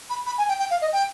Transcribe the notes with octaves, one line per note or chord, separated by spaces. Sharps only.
B5
B5
G#5
G5
G5
F5
D#5
G5